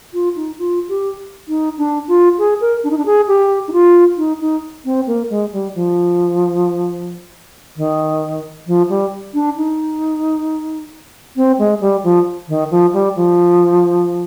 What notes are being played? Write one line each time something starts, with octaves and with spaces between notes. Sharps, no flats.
F4
D#4
F4
G4
D#4
D4
F4
G#4
A#4
D4
D#4
D4
G#4
G4
D#4
F4
D#4
D#4
C4
A#3
G#3
G3
F3
D#3
F3
G3
D4
D#4
C4
G#3
G3
F3
D#3
F3
G3
F3